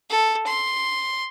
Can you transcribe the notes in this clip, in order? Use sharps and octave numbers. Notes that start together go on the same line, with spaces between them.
A4
C6